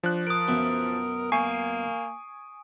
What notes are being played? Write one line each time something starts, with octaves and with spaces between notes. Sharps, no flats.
F3 D4 F#6
A#4 D#6 D7
F#2 B2 E5
A#3 G#5 C#6 C7